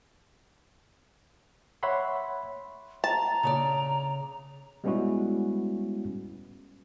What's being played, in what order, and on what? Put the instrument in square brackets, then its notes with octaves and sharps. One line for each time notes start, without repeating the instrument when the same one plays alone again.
[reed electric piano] C#5 E5 F#5 B5 C6
[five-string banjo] A5 [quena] A#5
[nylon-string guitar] C#3 C#5 D5
[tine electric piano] G3 G#3 B3 C#4 E4 F#4